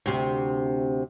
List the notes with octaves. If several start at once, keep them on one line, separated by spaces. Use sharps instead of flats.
D2 C3